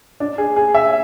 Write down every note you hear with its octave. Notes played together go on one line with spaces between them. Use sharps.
D4
G#4
G#4
E5